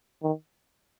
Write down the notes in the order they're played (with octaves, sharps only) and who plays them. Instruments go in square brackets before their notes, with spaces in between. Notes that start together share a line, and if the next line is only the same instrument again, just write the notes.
[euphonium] D#3